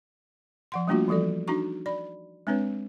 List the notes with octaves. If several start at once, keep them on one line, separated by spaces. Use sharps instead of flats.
F3 F#5 C6
G3 A3 A#3 D4 F4 F#4
E3 F3 G3 A4 D5
D4 D#4 F#4 A#5 C#6
D5 B5
G#3 C4 D4 B4 C#5